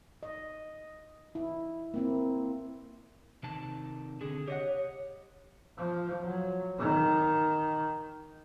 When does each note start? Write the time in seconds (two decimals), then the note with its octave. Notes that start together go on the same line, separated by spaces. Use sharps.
0.23 D#5
1.35 E4
1.94 A#3 C4 E4
3.43 C3 D#3 A5
4.21 D3 C4 G#4
4.48 G4 C#5 D#5 F#5
5.77 F3
6.22 F#3
6.79 D#3